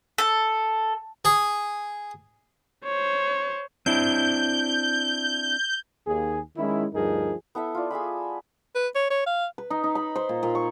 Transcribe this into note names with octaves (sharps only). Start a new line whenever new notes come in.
A4
G#4
C5 C#5
C4 D4 E4 G6
D#2 G#4
D#3 G#3 C#4 E4
D2 G2 F3 D#4 G#4 A#4
B3 E4 A4 E5
F4 D5
G#4 E5 A5 B5
B4
C#5
C#5
F5
B4
D#4
D#4
B5
C5
A#2
A#2
C#6